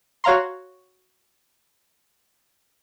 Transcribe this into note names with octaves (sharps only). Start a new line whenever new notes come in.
F#4 C#5 F5 A#5 C6